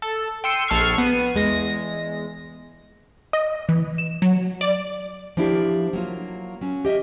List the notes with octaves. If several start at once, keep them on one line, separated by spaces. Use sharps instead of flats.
A4
G5 C6 E6 C#7 D#7
A#1 A4 C#6 F6 G#6 C7
B3 D#7
E2 G#3 A#6
D#5
E3
E7
F#3
D5
F3 A#3 D4 E4 F4 G4
F#3 A#3 F4
F#3 C#4
G4 D#5 E5